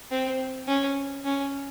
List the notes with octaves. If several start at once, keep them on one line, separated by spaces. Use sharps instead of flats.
C4
C#4
C#4